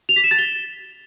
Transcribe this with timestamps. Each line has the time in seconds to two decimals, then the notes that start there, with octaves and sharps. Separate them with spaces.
0.09 F7
0.16 B6
0.24 E7
0.31 A6
0.38 G7